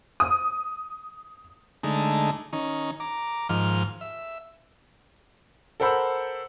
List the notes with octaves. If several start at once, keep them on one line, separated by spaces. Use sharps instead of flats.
D#6
D3 G#3 A3 D#4
D#3 C#4 D#4
A#5 D6
G#2 D#3 F3 F6
E5
A4 A#4 C5 F#5 B5 E6